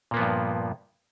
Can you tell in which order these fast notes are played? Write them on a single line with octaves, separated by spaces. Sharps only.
A#2 A#3 B3 F3 G2